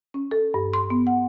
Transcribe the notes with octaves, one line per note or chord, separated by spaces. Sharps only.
C#4
A4
G2
C6
B3
F#5